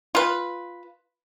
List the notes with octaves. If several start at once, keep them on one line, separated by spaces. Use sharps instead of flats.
F4 B4